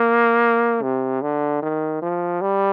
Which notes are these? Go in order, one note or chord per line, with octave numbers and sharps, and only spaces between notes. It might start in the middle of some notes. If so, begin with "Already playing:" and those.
Already playing: A#3
C3
D3
D#3
F3
G3